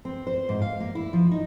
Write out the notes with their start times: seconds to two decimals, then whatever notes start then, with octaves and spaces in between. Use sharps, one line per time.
0.05 C4
0.27 C5
0.49 G#2
0.62 F5
0.80 A#3
0.95 E4
1.13 F3
1.31 D#4